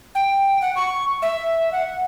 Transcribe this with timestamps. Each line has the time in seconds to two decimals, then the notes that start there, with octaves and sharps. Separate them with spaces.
0.15 G5
0.61 F#5
0.76 C#6
1.22 E5
1.72 F#5